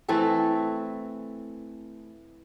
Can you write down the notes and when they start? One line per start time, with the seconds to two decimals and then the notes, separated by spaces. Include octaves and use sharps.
0.09 E3 A3 C4 A4